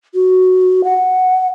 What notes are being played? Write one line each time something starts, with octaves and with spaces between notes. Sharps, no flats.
F#4
F#5